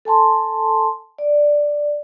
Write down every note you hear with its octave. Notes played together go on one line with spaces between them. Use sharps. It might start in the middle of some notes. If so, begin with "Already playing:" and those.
A4 G#5 A5 C6
D5